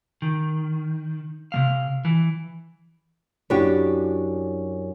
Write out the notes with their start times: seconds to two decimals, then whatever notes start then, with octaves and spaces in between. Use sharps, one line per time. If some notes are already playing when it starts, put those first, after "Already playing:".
0.22 D#3
1.52 C3 G3 F5
2.05 E3
3.50 F#2 D4 E4 F#4 G4